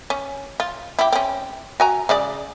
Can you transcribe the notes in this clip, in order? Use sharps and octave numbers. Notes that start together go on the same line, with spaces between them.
C#4
F4
E4 G4
C4 C#4
F#4 G#5 A#5
C#3 G#3 D5